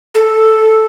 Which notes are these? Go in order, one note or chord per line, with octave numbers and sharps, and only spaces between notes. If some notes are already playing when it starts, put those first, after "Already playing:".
A4